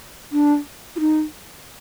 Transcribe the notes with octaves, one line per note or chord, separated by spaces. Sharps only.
D4
F4
D#4